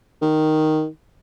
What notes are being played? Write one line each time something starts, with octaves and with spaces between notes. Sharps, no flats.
D#3